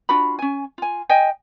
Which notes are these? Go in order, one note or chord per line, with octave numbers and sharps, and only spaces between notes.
D4 F4 F#4 B5
C#4 G#5
F4 G#5
D#5 G5 G#5